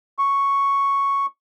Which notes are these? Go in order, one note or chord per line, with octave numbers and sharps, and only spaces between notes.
C#6